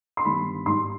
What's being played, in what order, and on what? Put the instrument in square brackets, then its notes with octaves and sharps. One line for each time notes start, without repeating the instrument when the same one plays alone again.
[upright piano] C6
G1 G2 D#3 G3 B5
G#1 G#2 G3 C6